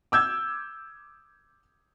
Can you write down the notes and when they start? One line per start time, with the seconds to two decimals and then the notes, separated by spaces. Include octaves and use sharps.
0.12 D6 E6 G6 G#6